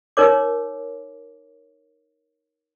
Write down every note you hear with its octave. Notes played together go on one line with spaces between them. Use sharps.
D#4 A#4 C#5 D6